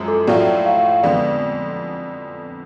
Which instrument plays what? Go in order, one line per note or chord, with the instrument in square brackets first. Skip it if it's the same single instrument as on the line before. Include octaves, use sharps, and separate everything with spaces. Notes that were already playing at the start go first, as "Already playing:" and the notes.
Already playing: [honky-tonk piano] F#2 F3 G#3
[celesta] A4
[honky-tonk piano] A2 F#3 A3 F4 [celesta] D5
[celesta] F5
[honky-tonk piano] F2 D3 G#3 B3 [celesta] D5